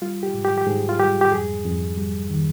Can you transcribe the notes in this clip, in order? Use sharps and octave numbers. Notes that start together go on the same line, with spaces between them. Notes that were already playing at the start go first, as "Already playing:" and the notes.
G3 F4
G4
G#2
G4
G4
G#2 G#4
F4
G3 G4
G4
F2 G#4
F2
G3
D#3